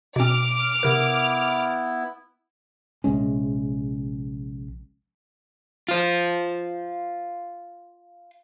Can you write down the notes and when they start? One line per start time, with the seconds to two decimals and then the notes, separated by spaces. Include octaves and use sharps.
0.16 B2 C4 D6 F6
0.83 C3 B3 E4 A#4
3.04 A#1 C3 G#3 C#4
5.88 F4 C5